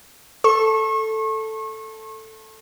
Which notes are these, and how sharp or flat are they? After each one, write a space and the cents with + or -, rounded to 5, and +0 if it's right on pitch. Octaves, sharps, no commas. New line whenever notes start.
A4 +0 C#6 -35